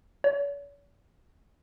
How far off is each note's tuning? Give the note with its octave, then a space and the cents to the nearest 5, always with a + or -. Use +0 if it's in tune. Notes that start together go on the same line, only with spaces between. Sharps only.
C#5 +45